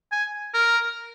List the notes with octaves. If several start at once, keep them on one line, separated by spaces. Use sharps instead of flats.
G#5
A#4